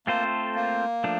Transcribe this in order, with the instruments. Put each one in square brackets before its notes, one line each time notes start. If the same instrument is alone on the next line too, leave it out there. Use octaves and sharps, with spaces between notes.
[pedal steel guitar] A3 C4 F4 A4 C5 [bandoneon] A#3
[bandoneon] A#3
[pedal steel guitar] F3 A3 D4